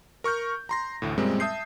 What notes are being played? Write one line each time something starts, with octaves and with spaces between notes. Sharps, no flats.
A#4 C#6 F6 G6
A#5 C6 A#6
A1 D2 A2
F#2 A#2 G3 G#3 C4
E5 A5 D#6 G6 C7